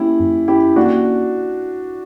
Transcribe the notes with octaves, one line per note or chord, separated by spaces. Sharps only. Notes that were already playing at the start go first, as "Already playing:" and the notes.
Already playing: A#3 C#4 E4 G4
F#2
C#4 E4 G4
A#3 D4 F#4